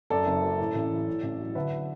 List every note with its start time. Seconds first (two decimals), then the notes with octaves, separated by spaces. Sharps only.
0.10 F#2 A4 D5
0.26 F#1
0.43 F#3
0.59 A2
0.75 A1
0.91 E3
1.07 A2
1.23 A1
1.40 F#3
1.55 D3 B4 E5